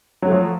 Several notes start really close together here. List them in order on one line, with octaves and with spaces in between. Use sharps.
F#3 A3 F3